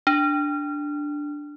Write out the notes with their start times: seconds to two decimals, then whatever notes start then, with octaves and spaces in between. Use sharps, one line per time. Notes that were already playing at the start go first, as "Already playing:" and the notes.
0.07 D4